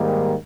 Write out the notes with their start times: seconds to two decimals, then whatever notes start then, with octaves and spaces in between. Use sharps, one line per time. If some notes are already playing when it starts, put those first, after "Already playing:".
Already playing: G#2 D#3 G3 A#3